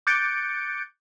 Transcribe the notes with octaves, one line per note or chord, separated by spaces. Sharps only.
D6 F#6 G6 A6 C#7 D7